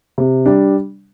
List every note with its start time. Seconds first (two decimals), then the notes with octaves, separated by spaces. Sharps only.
0.18 C3
0.46 G3 D4